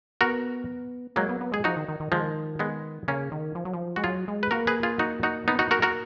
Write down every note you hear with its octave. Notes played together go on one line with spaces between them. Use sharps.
B3 F#4 A#4
F#3 G#3 A#3
B3
B3
G#3 G#4
F3 D#4 F#4
D#3
D#3
D#3
D#3 F3 G#3
G#3 B3
C#3 A#3 C#4
D#3
F3
F#3
F3
G#3 F#4
F#3 F4 G#4
G#3
B4
A#3 F#4 A#4
G#4 B4
F4 G#4
D#4 F#4
D#4 F#4
B3 D#4
D#4 F#4
F#4 A#4
F#4 A#4